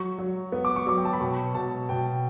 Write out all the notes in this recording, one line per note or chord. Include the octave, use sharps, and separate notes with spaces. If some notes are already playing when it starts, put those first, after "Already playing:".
Already playing: F#3 C#6
F#3
B3
D6
C#6
F#3 D6
G5
A5
B5
B2 C#6
B2 A5
B2 G5